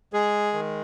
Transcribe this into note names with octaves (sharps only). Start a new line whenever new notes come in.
G#3 G#4
D#3